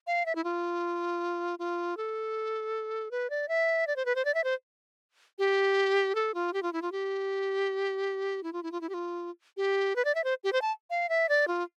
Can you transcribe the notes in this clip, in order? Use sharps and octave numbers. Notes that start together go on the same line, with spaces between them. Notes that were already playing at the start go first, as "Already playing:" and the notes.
F5
E5
E4
F4
F4
A4
B4
D5
E5
D5
C5
B4
C5
D5
E5
C5
G4
A4
F4
G4
F4
E4
F4
G4
E4
F4
E4
F4
E4
G4
F4
G4
B4
D5
E5
C5
G4
C5
A5
F5
E5
D5
F4